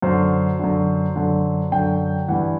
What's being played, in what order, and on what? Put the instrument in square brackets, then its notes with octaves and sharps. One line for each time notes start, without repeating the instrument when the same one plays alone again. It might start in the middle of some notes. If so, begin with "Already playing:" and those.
[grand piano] F#2 D3 C5
F#2 D3
F#2 D3
F#2 D3 G5
G2 E3 F#5